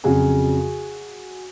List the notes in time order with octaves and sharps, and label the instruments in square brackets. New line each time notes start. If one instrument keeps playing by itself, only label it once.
[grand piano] F2 C#3 F#3 F#4 G#4